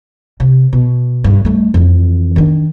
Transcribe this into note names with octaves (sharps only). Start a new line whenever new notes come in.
C3
B2
G2
G3 A3
F2 E3
D#3 D4